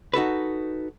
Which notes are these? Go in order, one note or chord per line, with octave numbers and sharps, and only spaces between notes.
D#4 F#4 A4 B4